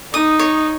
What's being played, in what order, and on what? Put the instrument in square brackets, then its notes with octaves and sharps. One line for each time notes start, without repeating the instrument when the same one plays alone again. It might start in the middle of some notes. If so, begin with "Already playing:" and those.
[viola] D#4 [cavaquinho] D#6
[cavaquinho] C#5